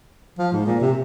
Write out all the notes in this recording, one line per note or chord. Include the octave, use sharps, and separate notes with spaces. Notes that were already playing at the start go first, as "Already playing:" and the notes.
F3
G#2
A#2
C3